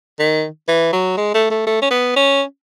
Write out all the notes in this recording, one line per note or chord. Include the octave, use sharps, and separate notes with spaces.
D#3
E3
F#3
G#3
A3
A3
A3
C#4
B3
C#4